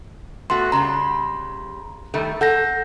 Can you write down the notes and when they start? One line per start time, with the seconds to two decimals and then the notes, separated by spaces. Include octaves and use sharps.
0.50 A3 B3 F#4 C6
0.72 C#3 G3 A#5 C6
2.14 D#3 G3 A3
2.41 A4 F#5 G6 A#6